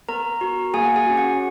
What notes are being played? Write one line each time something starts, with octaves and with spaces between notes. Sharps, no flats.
B3 A#4 A#5
F#4
A#3 G#4 G#5
F#5
G#4 G#5
F#4
C#4
F#4 F#5